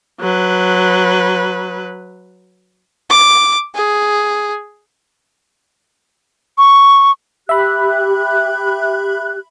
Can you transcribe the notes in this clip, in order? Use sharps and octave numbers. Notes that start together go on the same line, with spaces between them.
F#3 B4
D6
G#4
C#6
G4 E5 B5 F#6